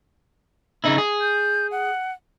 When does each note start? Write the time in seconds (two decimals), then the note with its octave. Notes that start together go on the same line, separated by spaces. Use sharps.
0.84 C#3 D#4 E4
0.98 G#4
1.21 G6
1.71 F#5